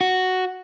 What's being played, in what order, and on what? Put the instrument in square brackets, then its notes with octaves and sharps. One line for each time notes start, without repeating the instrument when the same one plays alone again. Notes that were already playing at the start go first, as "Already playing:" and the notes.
[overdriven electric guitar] F#4